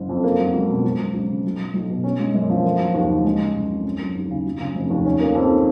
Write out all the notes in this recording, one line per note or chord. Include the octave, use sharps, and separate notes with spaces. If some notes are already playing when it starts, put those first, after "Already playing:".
Already playing: F#1
F2
A#3
F#3
C#2
B2
C#2
F#3
C#2
C#3
B1
F#3
B1
B2
C#4
G#3
F#2
F3
A#3
F#3
D#2
C#3
G#3
C#3
F#1
F2
C#4
F#3
D#2
C#3
F#3
C#3
F1
D#2
C#4
A#3
F2
D#3